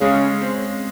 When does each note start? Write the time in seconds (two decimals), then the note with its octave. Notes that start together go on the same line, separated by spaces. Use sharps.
0.01 C#3 G#3
0.42 C4